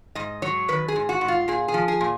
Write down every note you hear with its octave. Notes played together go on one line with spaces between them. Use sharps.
G#2 D#5
F#3 C#5
D#3 B4
G#4
G#2
F#4
G#2
F4
A#2 G#4
G#4
F3
G#4
A#2